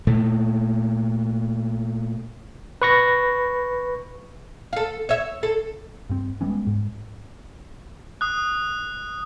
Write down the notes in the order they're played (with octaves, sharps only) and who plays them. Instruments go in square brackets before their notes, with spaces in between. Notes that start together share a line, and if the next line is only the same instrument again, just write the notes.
[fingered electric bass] A#2 A3
[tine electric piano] B4 C#6 A#6
[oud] A4 F5
C#5 E5
A4
[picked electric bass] G2 C4
G3 G#3 B3 C#4
G#2
[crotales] D#6 F#6